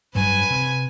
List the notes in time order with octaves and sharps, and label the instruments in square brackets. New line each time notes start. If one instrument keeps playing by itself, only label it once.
[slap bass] G2 F#3 [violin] B4 G#5
[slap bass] C3